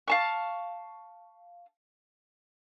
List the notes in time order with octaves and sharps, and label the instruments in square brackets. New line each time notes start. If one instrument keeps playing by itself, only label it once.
[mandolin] F5 A5 C#6